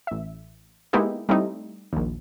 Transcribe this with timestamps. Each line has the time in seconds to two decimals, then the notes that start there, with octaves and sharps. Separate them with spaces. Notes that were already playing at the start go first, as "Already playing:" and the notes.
0.07 A1 E5
0.93 G#3 A#3 B3 D#4 E4 G4
1.29 G3 A3 C4 D#4 E4
1.93 A#1 D#2